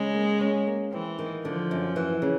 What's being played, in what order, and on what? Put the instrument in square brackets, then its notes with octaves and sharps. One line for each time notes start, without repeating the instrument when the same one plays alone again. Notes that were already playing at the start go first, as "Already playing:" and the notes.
Already playing: [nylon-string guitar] C#3 [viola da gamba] G#3
[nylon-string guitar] A#3
C#4
A#3
[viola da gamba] E3 [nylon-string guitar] C4
[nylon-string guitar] D#3
[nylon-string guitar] D3 [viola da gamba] F3
[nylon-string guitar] F#2
E3
C#3